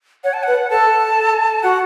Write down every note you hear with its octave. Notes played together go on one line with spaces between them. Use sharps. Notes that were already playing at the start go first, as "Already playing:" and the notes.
C#5 F#5
A5
B4 F#5
A4 A5
A4
F#4 F#5